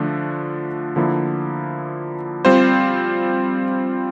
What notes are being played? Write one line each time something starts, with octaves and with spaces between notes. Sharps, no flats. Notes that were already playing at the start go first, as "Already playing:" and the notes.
Already playing: D3 F3 A3 D4
D3 F3 A#3 E4
G3 C4 F4 C5